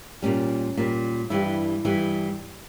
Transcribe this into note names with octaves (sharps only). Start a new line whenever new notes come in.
A#2 G3 C#4
A#2 G3
G2 E3 G3 E4
G2 E3 G3